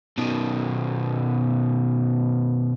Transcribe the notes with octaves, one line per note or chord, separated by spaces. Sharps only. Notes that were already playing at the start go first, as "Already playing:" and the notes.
B2 D#3